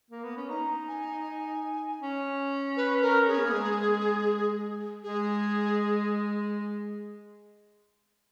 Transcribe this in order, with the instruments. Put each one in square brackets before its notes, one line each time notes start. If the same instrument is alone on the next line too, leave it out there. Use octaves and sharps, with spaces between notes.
[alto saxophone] A#3
B3
C#4
[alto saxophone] D#4 [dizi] A#5
[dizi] G#5
[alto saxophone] C#4
[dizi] B4
A#4
[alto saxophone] C#4 [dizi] G#4
[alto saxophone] B3
A#3
G#3
[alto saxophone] G#3 [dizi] G#4